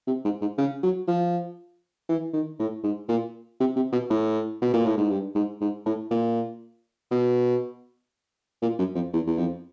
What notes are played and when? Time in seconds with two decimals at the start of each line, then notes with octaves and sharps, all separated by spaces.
0.07 C3
0.25 G#2
0.41 G#2
0.58 C#3
0.83 F#3
1.08 F3
2.09 E3
2.33 D#3
2.60 A2
2.84 G#2
3.09 A#2
3.60 C3
3.76 C3
3.92 B2
4.10 A2
4.62 B2
4.74 A#2
4.86 A2
4.98 G#2
5.10 G2
5.35 G#2
5.61 G#2
5.86 A2
6.11 A#2
7.11 B2
8.62 A#2
8.79 F#2
8.95 F2
9.13 E2
9.27 E2
9.38 F2